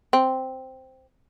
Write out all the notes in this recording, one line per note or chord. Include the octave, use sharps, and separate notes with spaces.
C4